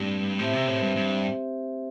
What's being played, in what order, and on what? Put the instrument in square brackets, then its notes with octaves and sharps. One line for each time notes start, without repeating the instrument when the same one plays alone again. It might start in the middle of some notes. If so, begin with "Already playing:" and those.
Already playing: [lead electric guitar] G2 [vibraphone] A3 C4 G4
[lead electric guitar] A2 [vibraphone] C4 G4 C5 E5
[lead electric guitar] C3
A2
G2
G2